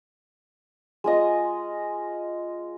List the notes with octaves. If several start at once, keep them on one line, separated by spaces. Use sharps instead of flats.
G#3 F4 D#5